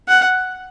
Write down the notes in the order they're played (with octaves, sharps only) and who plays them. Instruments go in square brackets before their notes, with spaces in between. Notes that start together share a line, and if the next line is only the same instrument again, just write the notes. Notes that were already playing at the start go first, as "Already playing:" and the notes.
[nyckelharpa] F#5